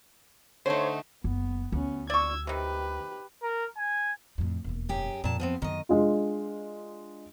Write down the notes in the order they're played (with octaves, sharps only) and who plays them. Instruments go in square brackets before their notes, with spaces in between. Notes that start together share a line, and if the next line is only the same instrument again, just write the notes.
[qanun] D3 D#4 [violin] A3 [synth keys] C5 [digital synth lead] C#5
[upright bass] F#1 [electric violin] B3
[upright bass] D2 [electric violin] B3 C#4
[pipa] D5 C#6 [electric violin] E6 G#6
[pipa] C3 D#3 [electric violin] G4 B4
[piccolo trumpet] A#4
G#5
[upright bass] F2 A2
E1 D#2
[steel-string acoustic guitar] F#2 G4 G#4
[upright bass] F2 [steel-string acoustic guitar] A#2 A5
[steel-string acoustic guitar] F3 B3 C4
[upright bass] F#2 D3 [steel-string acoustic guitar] D#3 D#5
[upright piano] G#3 D4 F4